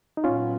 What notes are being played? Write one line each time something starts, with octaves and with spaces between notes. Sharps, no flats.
D#4
A#2 F#3 B3 C#4 F4